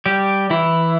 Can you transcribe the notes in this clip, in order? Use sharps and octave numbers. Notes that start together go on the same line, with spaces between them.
G3 G4
E3 E4